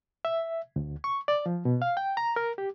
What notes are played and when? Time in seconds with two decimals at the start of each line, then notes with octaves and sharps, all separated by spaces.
0.25 E5
0.76 D2
1.04 C#6
1.28 D5
1.46 F3
1.65 B2
1.82 F5
1.97 G5
2.17 A#5
2.36 A#4
2.58 G4